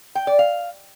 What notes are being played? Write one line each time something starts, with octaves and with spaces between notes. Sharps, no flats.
G5
D5
F5